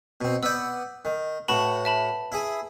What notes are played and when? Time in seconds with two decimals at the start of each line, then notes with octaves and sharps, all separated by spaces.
0.21 B2 C4
0.43 B3 D5 E6 G6
1.05 D#3
1.48 A2 F#4 B4 A5 B5
1.85 E5 A5 B5
2.32 E4 G#4